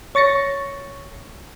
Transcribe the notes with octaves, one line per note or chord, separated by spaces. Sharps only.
C#5 C#6 A6 A#6 C#7